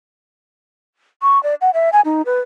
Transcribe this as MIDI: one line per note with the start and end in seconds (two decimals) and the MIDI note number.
1.22 1.41 85
1.43 1.55 74
1.61 1.70 78
1.74 1.89 76
1.93 2.01 80
2.05 2.22 63
2.26 2.40 71